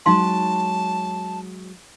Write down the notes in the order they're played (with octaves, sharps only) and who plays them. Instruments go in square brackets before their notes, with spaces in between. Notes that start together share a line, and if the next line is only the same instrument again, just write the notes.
[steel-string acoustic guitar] F#3 G#3 [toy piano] D#4 F5 C6 [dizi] A5